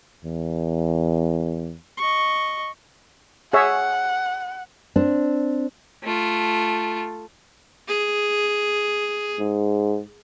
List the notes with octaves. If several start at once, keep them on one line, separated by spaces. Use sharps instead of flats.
E2
D#5 C#6
G#4 C#5 E5 F#5
C4 D4
A3 F4
G#4
G#2